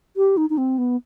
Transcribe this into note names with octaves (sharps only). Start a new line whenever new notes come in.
G4
D#4
D#4
C4
B3